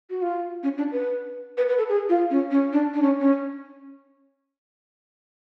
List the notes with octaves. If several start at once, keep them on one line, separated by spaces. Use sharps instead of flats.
F#4
F4
C#4
D4
B4
B4
B4
A4
G#4
F4
C#4
C#4
D4
D4
C#4
C#4